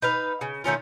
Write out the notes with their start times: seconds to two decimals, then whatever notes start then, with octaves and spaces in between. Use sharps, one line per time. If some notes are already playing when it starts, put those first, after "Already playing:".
0.02 D#4 B4 F5
0.41 C#3
0.64 D#3 A3 C#4 F4